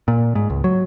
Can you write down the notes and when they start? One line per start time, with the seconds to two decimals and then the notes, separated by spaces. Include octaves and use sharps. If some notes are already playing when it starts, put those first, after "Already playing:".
0.08 A#2
0.35 G#2
0.50 C#2
0.64 F#3